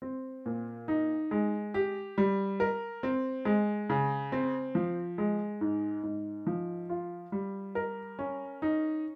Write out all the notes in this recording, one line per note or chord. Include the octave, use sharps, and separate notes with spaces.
C4
A#2
D#4
G#3
G4
G3
A#4
C4
G#3
C#3
C4
F3
G#3
G#2
G#2
F3
F4
G3
A#4
C#4
D#4